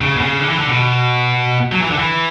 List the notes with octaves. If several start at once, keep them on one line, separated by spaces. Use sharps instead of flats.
C#3
B2
C#3
D3
E3
D3
B2
F#3
E3
D3
E3